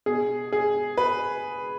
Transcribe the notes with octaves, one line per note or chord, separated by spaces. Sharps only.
B2 G#4
G#4
B4